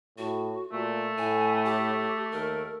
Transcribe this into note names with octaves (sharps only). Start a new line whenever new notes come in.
A2 F#4
A#2 A3
A2 G#5
G4
D#2 A#4